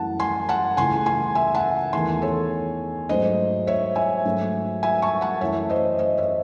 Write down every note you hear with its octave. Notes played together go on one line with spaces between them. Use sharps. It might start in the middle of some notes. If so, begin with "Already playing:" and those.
Already playing: F#2 E3 A3 F#5 A5
G#5 C6
F#5 A5
C#2 C#3 E3 A3 G#5 C6
G#5 C6
E5 G#5
F#5 A5
E2 D#3 A3 G#5 C6
A4 C#5
G#2 F#3 A3 C5 D#5
C#5 E5
E5 G#5
G#2 F#3 A3
E5 G#5
A5 C#6
F#5 A5
F#2 E3 A3 C#5 E5
C5 D#5
C5 D#5
C#5 E5